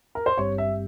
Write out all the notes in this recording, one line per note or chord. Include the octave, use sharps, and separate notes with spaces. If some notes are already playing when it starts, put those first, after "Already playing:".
A#4
C5
G#1 G2 G3 C4 G4 C#5
E5